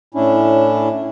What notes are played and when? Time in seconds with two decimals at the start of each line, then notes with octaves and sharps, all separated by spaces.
0.14 A2 C#4 D4 E4